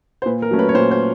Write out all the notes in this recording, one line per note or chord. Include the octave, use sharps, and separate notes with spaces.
C5
A#2 B4
A#4
F#3 A3 C#4
B4
C#5
A#2 C5
C5